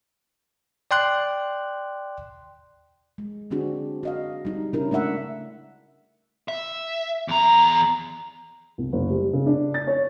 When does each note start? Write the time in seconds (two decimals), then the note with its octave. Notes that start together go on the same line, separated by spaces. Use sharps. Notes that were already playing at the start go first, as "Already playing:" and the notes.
0.91 D5 G5 C6 F#6
3.18 G#3
3.51 D3 C4 D4 F#4 G#4
4.03 F#4 D#5 F5
4.45 G3 D#4
4.73 C#3 C#4 D4 E4 A#4
4.91 G#3 A3 D4 E5 F#5
6.48 E5
7.28 E2 A#5
8.78 C2
8.93 F#1
9.10 G3
9.33 C#3
9.46 D4
9.74 A6
9.87 C#5